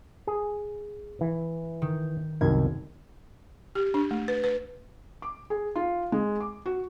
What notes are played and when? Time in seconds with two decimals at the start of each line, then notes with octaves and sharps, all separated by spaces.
0.27 G#4
1.21 E3
1.82 D#3
2.41 C2 F#2 D#3 G#6
3.75 G4
3.94 D4
4.11 A3
4.28 B4
4.44 B4
5.22 D6
5.50 G#4
5.76 F4
6.12 G#3
6.40 D6
6.66 F#4